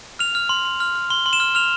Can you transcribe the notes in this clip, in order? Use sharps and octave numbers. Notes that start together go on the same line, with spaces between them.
F6 F7
F6
C6
C6
F6
F6
C6 G7
C6
E7
F6
F6 F7